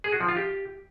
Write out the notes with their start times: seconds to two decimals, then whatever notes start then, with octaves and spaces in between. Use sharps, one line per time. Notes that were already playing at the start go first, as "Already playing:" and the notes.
0.04 G#4
0.12 F#4
0.20 F3
0.28 F4
0.37 G4